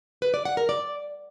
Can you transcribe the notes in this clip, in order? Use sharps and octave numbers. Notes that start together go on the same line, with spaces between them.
B4
D5
F#5
A#4
D5